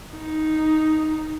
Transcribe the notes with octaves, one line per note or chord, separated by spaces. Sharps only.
D#4